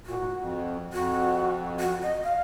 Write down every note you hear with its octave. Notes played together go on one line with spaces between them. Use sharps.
A#2 F#4
G#2
F2
F2 F#4
F#4
D#5
F5